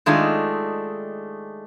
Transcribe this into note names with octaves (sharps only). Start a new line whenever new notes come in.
D#3 G#3 A3 D4 D#4 F4